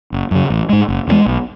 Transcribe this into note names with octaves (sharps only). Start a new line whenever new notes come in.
F#1
F#2 C#3
A1
G#2 G#3
F#1
E2 C#3 G#3
B1